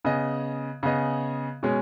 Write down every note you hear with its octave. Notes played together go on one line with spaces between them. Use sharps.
C#3 B3 G#4 D#5
C#3 B3 G#4 D#5
B2 G#3 C#4 G#4